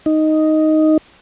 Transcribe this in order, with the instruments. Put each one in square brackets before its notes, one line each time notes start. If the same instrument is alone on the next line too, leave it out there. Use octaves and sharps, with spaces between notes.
[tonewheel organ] D#4